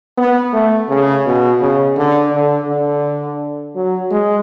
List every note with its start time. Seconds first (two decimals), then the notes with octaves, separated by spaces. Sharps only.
0.18 B3
0.53 A3
0.89 C#3
1.26 B2
1.61 C#3
1.97 D3
2.33 D3
2.67 D3
3.75 F#3
4.11 G#3